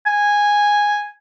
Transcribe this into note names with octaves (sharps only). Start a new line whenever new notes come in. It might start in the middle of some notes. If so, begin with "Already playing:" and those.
G#5